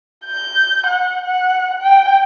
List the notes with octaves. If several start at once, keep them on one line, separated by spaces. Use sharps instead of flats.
G6
F#5
F#5
G5